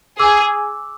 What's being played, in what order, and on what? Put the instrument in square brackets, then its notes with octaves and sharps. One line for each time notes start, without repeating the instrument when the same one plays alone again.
[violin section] G#4 [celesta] D6 E6